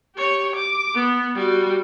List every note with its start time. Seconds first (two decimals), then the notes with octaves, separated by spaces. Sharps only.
0.16 G4 C#5
0.56 D6
0.95 B3
1.35 G3 F#4